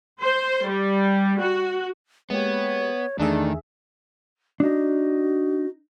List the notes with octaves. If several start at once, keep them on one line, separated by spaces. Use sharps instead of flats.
C5
G3
F#4
G#3 A#3 B3 G4 C#5
E2 D#3 A3 D4 G#4 E5
D4 D#4 F#4